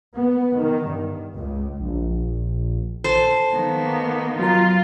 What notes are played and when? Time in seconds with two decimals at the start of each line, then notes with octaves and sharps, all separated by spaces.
0.17 B3
0.58 D#3
0.88 G2
1.34 C#2
1.80 A#1
3.04 A4 C5
3.53 D#3 A#3 B3
4.40 F#3 F4 A#5